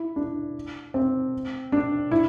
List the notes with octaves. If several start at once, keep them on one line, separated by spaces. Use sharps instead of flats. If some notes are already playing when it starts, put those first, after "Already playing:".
Already playing: E4
D4
C4
D4
E4